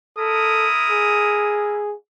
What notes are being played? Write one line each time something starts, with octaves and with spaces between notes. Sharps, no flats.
E4 A4 A#4 D#6
G#4